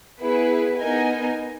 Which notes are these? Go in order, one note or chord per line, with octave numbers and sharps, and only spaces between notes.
B3 E4 G#4 B4
B3 D#4 A#4 D#5 G#5